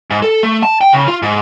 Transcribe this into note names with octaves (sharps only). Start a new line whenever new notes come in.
G#2
A4
A3
A5
G5
C#3
F4
G#2